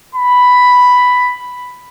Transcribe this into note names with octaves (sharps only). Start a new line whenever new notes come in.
B5